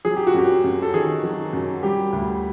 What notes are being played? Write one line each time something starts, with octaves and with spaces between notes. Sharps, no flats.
F#3 G#4
G4
F#4
F#2 G4
F#2
A4
D#3 G#4
F#3
F#2
G3 G4
D2